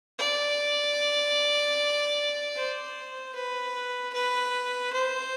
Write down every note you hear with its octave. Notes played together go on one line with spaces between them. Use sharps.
D5
C5
B4
B4
C5